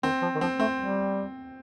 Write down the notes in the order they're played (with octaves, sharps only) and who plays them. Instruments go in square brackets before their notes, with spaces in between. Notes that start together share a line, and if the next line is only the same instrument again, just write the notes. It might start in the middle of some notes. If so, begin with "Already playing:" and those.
[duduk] D#3 [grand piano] C4
[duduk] F3
D#3
[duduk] F3 [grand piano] C4
[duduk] A3 [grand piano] C4
[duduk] G3